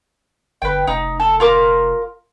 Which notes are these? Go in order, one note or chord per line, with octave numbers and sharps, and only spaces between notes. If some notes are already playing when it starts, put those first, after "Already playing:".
G1 B4 G5
F1 D#4
A4
F4 A#4 D6